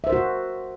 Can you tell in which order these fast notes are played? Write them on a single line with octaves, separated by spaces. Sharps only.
E5 C5 A#4 F#4